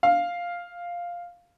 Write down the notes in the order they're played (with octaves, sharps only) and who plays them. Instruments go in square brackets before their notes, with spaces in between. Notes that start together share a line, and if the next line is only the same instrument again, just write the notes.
[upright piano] F5